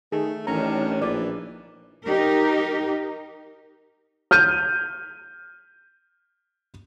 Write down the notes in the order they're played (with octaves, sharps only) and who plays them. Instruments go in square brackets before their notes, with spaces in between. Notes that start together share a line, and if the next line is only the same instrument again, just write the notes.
[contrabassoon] D#3 [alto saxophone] A3 [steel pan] G#4
[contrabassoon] A1 [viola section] D#3 D4 [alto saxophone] C#4 [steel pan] A#5
[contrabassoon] A#1 [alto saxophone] E3 [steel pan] D5
[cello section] D#4 G4 A#4
[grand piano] F6 G6 D#7